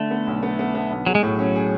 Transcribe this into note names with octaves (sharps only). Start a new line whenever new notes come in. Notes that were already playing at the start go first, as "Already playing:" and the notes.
Already playing: D3 A3
B3
B1
B3
B3
B3
B1
F#3 G#4
G#3
A2 F#3
C#4
G#4